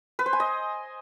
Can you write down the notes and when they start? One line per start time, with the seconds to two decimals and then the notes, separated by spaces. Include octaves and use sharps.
0.19 B4
0.26 C5
0.33 G#5
0.40 D#5